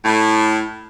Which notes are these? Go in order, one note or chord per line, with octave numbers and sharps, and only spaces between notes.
A2